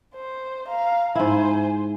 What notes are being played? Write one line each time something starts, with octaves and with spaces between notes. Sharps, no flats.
C5
F5 A#5
G#2 E4 C5 G#5